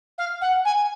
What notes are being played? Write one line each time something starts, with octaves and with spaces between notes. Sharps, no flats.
F5
F#5
G#5